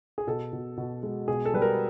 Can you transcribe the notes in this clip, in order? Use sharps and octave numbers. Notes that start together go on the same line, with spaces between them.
G#4
B2 A4
B2
B2
G#3
B2 G#4
A4
G3 B4
A#4